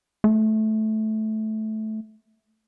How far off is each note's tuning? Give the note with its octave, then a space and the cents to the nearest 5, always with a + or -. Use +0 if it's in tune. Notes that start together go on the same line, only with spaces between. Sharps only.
A3 -15